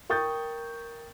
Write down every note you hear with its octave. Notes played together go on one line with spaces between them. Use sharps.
A#4 G5 C#6 D#6 G6 A6